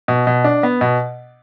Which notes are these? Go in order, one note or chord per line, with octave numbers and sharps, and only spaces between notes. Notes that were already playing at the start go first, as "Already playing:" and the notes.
B2
B2
D4
B3
B2